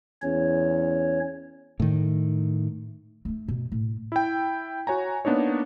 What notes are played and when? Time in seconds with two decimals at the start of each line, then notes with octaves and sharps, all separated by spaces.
0.22 E2 C#4 C#5
1.80 A2 D#3
3.25 A3 D#4
3.48 B2
3.72 A2
4.12 E4 G5
4.87 F#4 C#5 G#5 A#5
5.25 A#3 B3 D4 D#4 C#5